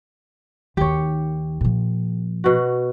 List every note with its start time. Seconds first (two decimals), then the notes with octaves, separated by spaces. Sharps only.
0.77 D#2 D#3 G4 C#5
1.61 A#2 F3
2.44 B2 F#4